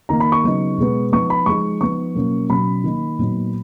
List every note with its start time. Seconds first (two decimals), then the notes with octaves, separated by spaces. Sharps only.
0.09 D#3 A#3 D#4 A#5
0.20 B5
0.32 C#6
0.43 C#3 F#3 B3 D#4
0.78 B2 G#3 B3
1.12 F3 B3 D#4 C#6
1.30 B5
1.46 F3 G#3 D#4 C#6
1.81 F3 B3 D#4 C#6
2.15 B2 F#3 A#3 C#4
2.49 B2 F#3 C#4 B5
2.84 D#3 A#3 D#4
3.19 A#2 F#3 B3 D#4